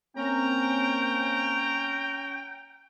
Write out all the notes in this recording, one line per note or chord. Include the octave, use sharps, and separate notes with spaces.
A#3 C4 C#4 G5 A#5